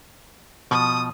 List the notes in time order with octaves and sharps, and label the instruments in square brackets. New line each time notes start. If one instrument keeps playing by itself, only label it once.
[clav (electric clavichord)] B2 F3 [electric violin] D#6